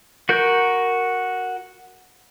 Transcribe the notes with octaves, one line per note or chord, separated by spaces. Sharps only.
F#4 A#4 G6